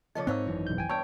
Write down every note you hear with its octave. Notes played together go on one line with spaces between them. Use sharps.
C#3 F3 A4 D#5 D6
G#2 C4 D#4 C5 C#5 F5 E6
G#1 F#2 E3
B1 G6
G5 G#5
E2 G2 C#5 G5 A5 E6